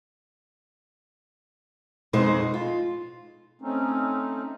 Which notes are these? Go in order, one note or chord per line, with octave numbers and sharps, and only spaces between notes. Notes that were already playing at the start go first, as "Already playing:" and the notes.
F2 B2 G#3 D#4 G#4 C5
F4
A3 C4 C#4 D#4